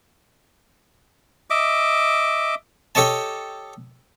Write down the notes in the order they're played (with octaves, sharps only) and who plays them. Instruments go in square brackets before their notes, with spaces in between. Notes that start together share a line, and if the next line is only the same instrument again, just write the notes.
[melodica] D#5 E5 D6
[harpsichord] G4 A4 C#5 D#5 A5